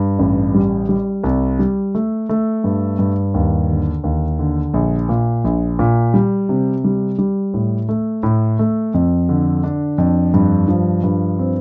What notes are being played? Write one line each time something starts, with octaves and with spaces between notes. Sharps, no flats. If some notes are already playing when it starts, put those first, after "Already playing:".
Already playing: G2
A1
G3
G3
C2
G3
A3
A3
G2
G2
D#2
D3
D#2
D3
A#1
A#2
A#1
A#2
G3
C3
G3
G3
A2
A3
A2
A3
F2
D3
D4
F2
G2
F3
G2
C4